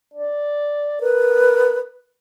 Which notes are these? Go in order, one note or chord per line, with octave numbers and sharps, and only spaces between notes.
D5
A#4 B4